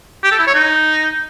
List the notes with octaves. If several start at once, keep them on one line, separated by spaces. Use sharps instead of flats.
G4
A4
E4
C#5
D#4